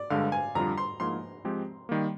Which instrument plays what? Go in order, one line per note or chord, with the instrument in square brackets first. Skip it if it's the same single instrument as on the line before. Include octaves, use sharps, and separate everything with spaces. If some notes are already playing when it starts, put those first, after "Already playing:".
Already playing: [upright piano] D5
[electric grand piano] G2 D3 G#3 [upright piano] F5
[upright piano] G#5
[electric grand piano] F2 D3 G3 D4 F4 [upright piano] A#5
[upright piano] C6
[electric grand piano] G#2 F3 A#3 [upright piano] C6
[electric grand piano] F3 G#3 C4 G4
D#3 G3 A#3